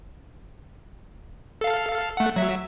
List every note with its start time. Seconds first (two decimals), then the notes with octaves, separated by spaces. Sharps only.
1.61 A4 F5
2.17 A3 F#5
2.36 F#3 E5